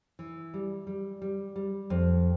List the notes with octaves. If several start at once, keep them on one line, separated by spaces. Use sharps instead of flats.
E3
G3
G3
G3
G3
F2